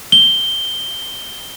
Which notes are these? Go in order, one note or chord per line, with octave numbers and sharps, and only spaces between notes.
G7